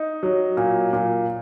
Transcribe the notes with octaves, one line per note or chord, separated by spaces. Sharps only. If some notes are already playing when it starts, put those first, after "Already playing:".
Already playing: D#4
F#3
A#2
A#2